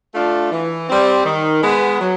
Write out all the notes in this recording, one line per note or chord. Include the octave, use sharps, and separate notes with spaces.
A3 D4 F4
E3
G3 C4
D#3
G#3 B3
F#3